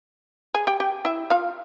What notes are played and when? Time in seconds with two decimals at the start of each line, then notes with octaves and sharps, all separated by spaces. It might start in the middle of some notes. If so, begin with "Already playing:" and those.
0.54 G#4 G#5
0.67 G4 G5
0.80 G4 G5
1.05 E4 E5
1.30 F4 F5